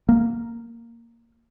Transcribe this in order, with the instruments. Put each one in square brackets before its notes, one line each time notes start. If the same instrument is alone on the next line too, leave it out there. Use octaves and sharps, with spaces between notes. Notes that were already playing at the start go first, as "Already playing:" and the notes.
[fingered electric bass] A#3